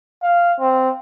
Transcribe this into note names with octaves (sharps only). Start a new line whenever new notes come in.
F5
C4